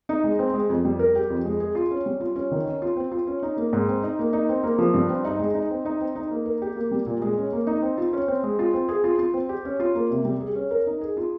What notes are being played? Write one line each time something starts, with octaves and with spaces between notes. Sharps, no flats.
D#4
G#3
C4
G#3
F2
G3
A#4
G4
F2
G#3
G#4
F4
C#4
G3
F4
C#4
D#3
C#4
F4
C4
F4
C#4
D#4
A#3
G#2
C4
D#4
A#3
D#4
C4
A#3
F3
G2
C4
D#4
G#3
D#4
C4
D#4
C4
D#4
A#3
A#4
G4
A#3
G3
A#2
G#3
C#4
A#3
D#4
C4
F4
C#4
C4
G#3
F4
C4
G#4
F4
F4
C4
G4
C#4
F4
A#3
C3
G3
G#4
C#4
A#4
D#4
G#4
F4